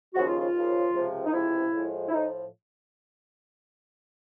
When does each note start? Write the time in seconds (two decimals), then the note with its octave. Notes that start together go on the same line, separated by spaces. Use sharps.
0.13 D#2 C#3 F3 F#4
0.27 F4
0.40 F4
0.54 D#2 C#3 F3
0.93 C#2 C3 F3
1.26 D#4
1.32 C#2 C3 F3 E4
1.72 A2 F3 G#3
2.08 E4
2.12 A2 F3 D#4